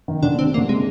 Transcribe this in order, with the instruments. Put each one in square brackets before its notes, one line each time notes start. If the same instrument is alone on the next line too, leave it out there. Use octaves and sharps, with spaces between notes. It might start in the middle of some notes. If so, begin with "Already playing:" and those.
[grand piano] D#3
[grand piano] D3 [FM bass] D4
[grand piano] A#2
[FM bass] C4
[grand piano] C3
[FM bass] A#3
[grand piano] D3
[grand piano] C3 [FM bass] G#3